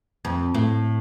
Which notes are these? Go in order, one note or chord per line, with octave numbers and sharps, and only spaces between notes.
F2
A2